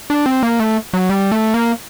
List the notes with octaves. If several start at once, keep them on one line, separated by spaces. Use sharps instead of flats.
D4
C4
A#3
A3
F#3
G3
A3
A#3